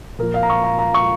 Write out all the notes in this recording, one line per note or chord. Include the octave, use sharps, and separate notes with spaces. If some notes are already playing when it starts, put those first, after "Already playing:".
A#2 F3 A#4
F5
A#5
C#6
A#5
A#5
C#6